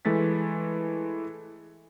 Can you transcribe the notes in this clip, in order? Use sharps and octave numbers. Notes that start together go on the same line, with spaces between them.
E3 G#3 A3 A6 B6